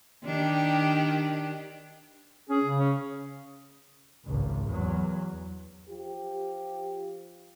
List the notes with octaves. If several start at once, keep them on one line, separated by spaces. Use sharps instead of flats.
D#3 D4 G4
C#4 G#4
C#3
C#4
G#1 C#2
E2 F#3
F3 F4 G4